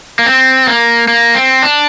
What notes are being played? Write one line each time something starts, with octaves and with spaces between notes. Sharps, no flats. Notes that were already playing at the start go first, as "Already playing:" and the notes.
A#3
C4
A#3
A#3
C4
D4